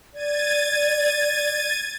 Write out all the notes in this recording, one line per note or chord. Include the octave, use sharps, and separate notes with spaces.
D5 G#6 A6 D#7